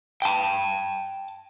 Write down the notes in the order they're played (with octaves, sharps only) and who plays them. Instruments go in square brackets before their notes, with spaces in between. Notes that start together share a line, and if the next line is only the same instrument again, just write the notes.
[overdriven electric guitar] G5 A5